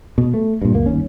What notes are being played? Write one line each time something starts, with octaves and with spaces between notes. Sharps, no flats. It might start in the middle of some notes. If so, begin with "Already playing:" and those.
B2
A3
G2 A#2
C#2 F#2 A#3
G1 D#2 C#4